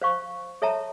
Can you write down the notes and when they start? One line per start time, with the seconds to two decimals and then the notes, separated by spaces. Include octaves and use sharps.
0.02 C5 F5 C#6
0.62 A4 C#5 E5 A5 A#5